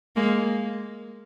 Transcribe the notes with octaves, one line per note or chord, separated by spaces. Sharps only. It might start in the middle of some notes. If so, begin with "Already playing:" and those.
G#3 A#3